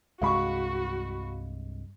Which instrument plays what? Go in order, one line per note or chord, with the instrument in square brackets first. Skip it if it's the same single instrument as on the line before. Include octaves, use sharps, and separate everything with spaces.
[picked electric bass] C2 G2 G#3 [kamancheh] F#4 [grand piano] F5 B5 C#6